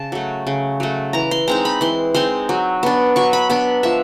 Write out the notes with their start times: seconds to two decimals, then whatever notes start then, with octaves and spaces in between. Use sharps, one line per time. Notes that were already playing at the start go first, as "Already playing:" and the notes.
Already playing: C#3 A5
0.12 F#3 A3
0.47 C#3
0.80 F#3 A3
1.13 E3 A#5
1.31 C6
1.48 G#3 C4 D#4 A#5
1.65 B5
1.81 E3 C6
2.14 G#3 C4 D#4 C6
2.49 F#3
2.83 B3 D4
3.16 F#3 C#6
3.33 B5
3.50 B3 D4 B5
3.83 F3 E5